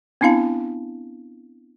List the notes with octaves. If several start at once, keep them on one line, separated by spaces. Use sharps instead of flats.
B3 C4 D4 E4 F5 A5